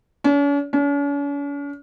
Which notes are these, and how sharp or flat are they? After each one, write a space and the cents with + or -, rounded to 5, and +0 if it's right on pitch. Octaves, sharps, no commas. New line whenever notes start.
C#4 +45
C#4 +45